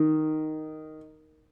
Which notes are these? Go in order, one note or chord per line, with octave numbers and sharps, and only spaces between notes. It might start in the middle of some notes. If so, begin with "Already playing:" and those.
Already playing: D#3